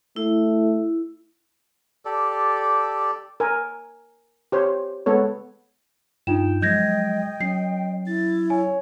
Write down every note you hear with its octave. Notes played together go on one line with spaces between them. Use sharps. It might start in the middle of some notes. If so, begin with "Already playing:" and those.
A3 E4
G4 A4 D5
A#4 G#5
G4 C5 C#5
G#3 B3 A4 C#5
G2 D#4 F4 G5 E7
F3 F#3 G#3 D#5 G6 G#6 A#6
F#3 C#4 C7
E4 A6
C#5 G#5